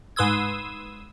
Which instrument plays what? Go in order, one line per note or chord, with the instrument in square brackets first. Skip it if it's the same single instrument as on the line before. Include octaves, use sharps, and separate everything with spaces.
[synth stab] G#2 B4 C6 D#6 E6 G#6